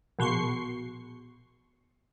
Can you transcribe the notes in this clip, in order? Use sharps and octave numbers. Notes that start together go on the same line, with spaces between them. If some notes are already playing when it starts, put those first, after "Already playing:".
A#1 B2 C6 C#6 C7